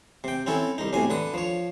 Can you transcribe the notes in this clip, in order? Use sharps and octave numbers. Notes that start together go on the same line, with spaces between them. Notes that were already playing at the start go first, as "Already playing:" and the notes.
C3 G5
C4 C#4 E4 A4
C2 D#4
B1 A2 C3 G#5
D3 B4 D#6
F3 C#5